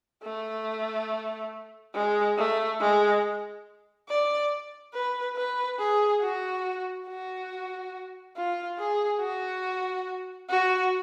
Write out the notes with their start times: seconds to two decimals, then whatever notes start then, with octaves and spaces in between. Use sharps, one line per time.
0.23 A3
1.94 G#3
2.37 A3
2.80 G#3
4.08 D5
4.94 B4
5.36 B4
5.79 G#4
6.21 F#4
7.07 F#4
8.36 F4
8.78 G#4
9.20 F#4
10.49 F#4